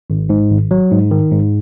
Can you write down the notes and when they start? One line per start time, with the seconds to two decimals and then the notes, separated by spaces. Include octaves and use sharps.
0.10 G#1
0.29 G#2
0.51 G#1
0.71 F#3
0.91 G#2
1.11 D#3
1.32 G#2